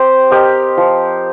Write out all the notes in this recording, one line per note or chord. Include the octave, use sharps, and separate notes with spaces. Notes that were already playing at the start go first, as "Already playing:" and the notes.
Already playing: C4 G4
G4 A#4 D#5
F3